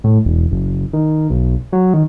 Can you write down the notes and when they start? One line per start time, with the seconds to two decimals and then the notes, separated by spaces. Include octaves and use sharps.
0.04 A2
0.25 E1
0.51 F#1
0.93 D#3
1.30 B1
1.73 F#3
1.94 D#3